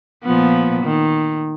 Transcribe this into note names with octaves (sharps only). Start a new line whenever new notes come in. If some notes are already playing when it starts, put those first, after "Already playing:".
A#2 F3 B3
D#3